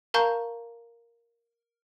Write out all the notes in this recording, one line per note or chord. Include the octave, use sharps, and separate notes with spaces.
A#4 F5 A5 A#5 C#6 G6